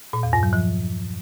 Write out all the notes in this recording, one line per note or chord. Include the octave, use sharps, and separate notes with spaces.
A#2
E2
G2
F#3
F3